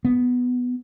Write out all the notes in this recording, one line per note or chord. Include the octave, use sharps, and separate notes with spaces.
B3